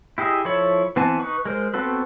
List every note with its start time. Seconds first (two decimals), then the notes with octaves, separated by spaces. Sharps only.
0.18 E4 G4 G#4 D#5 E5
0.45 F3 E4 A4 C#5 B5
0.96 E3 B3 C4 G#5 A5
1.20 D#4 B4 C#6
1.45 G#3 A#4 C5
1.74 B3 C4 F#4 A4 B4